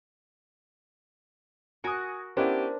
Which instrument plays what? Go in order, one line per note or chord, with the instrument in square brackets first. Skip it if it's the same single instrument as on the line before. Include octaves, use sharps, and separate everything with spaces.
[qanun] F#4 A#4 C#6 [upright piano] G#5 D#6
[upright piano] B3 C#4 E4 [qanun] D4 [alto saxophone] G4 [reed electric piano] A#4 C5